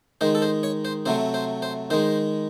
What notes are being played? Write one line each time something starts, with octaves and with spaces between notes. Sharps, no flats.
D#3 G#3 C5
A4
C5
C#5
C5
C3 F#3 A3 C5
C5
C5
D#3 G#3 C5